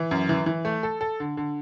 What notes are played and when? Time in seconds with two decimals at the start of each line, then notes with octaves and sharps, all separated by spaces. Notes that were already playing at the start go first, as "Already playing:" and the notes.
Already playing: E3
0.11 F#2
0.29 E3
0.46 E3
0.65 A3
0.83 A4
1.01 A4
1.20 D3
1.37 D3